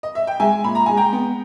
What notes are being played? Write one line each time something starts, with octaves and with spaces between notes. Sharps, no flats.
D#5
E5
G5
G#3 E5 G#5
A#2 B5
A#5
G#3 G#5
G5 A#5
B3